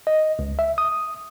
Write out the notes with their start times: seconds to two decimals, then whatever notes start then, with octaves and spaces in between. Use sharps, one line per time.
0.07 D#5
0.39 C#2
0.59 E5
0.78 D#6